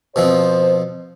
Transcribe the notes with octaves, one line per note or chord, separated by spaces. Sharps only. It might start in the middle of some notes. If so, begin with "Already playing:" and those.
B2 F3 C4 C5